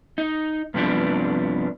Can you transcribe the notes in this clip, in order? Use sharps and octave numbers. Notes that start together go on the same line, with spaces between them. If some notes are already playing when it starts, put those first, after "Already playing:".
D#4
G2 C3 F3 B3 D4